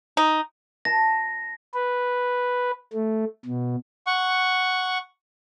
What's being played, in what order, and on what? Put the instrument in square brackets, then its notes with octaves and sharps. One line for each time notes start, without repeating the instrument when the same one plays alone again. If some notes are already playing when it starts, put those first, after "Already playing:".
[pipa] D#4
[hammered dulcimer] A5 [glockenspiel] A#6
[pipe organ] B4
A3
B2
[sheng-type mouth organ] F#5 C#6